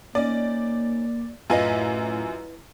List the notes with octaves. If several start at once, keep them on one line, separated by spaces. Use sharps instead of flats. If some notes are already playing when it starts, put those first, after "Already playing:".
A#3 C#4 D#4 D5
F#2 A2 E4 F4 B4 D#5 G#5